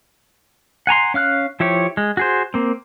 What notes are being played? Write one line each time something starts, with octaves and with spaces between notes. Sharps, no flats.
F#5 G#5 A#5 C6
C#4 F5 F6 F#6
F3 E4 G4 C#5
G#3
F#4 G#4 C5
A#3 C4